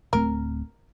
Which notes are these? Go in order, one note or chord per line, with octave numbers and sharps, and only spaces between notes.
D1 A3 C4 A#4